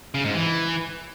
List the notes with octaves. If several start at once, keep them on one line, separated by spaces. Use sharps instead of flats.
C#3
G#2
E3